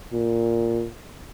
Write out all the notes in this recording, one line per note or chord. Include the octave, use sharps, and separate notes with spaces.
A#2